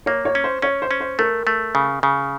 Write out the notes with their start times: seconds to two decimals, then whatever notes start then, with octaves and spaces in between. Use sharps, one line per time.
0.06 A#3 C#5
0.25 C#5
0.35 C#4
0.44 C5
0.62 C#4 C#5
0.82 C5
0.91 C#4
1.00 C5
1.19 A3 A#4
1.47 A3
1.75 C#3
2.03 C#3